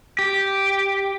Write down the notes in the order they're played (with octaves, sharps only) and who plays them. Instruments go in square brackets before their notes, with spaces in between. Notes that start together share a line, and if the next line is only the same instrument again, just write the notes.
[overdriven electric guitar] G4